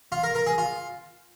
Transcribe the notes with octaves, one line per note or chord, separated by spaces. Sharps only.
F4
A#4
A#4
G#4
F4